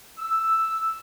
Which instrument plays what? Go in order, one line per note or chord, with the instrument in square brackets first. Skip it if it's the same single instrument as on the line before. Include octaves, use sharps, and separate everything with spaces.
[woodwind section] E6